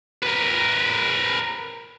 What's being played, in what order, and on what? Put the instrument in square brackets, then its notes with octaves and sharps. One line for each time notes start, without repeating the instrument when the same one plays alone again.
[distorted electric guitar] A#4 B4